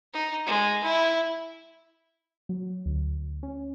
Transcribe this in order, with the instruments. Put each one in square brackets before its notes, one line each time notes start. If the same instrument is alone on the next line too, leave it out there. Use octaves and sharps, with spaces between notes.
[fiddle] D#4
G#3
E4
[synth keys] F#3
D2
C#4